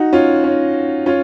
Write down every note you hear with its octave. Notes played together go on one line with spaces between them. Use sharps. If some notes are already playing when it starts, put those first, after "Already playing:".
Already playing: D#4 F#4
C#4 F4
C#4
C#4 F4